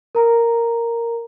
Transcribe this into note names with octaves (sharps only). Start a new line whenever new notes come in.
A#4 A#5